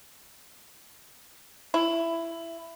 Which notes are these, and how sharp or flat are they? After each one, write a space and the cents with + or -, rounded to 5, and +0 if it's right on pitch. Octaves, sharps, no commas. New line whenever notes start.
E4 +15